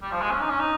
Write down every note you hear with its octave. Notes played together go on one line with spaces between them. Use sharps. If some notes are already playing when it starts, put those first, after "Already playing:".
G3
F3
G#3
C#4
D#4
C#4
D#4